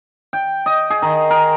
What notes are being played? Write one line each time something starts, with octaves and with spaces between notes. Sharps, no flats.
G5
D#5
G#4
D#3
A#4